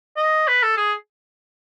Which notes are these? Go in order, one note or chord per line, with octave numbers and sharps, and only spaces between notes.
D#5
B4
A4
G#4